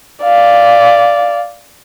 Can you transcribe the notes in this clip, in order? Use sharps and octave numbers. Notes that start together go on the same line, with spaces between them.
D5 F5